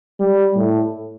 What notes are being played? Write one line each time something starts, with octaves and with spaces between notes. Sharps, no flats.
G3
A2